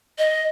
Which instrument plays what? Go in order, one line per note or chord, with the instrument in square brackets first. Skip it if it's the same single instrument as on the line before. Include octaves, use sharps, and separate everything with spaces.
[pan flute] D#5